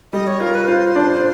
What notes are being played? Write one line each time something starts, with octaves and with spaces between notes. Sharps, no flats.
G3 D#5
C#5
F4 A#4
B4
F4 C5
D4